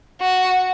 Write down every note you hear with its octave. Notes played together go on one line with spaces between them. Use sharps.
F#4